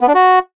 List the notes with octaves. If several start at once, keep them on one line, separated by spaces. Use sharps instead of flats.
B3
D4
F#4